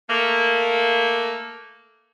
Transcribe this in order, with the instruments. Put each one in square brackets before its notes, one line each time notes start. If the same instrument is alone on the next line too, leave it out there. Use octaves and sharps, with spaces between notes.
[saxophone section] A3 A#3